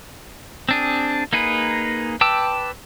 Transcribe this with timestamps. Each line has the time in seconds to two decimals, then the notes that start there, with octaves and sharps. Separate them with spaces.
0.69 C4 D4 G#4
1.33 A#3 D#4 G#4 B4
2.21 B4 G5 A5 D6 E6